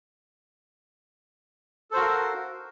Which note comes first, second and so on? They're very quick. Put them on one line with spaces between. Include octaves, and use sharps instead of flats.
A4 C5 F#4 A#4 F5